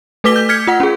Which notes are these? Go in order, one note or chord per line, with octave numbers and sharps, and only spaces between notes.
A3 A4 B4 D6 B6 G7
G6
F6 G#6 B6 C#7
F4 F#5
C#4 G#4